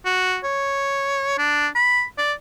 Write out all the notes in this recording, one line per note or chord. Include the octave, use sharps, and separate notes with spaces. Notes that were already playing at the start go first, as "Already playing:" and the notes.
F#4
C#5
D4
B5
D5